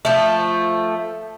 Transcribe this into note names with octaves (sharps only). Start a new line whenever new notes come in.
F3 A3